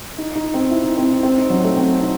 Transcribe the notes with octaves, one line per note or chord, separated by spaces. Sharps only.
D#4
D#4
C4
E4
D#4
C4
D#4
C4
D#4
F#3
A3
C4
D#4